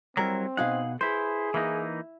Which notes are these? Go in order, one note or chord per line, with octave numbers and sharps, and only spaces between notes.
F#3 G3 C4 E4 A#4
B2 D#4 G#4 F5 F#5
E4 G#4 B4 C5
E3 A#3 D#4 E4